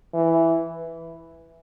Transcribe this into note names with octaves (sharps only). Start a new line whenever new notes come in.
E3